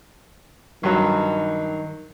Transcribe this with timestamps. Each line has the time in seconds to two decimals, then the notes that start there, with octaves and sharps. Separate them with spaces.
0.83 G2 D#3 F#3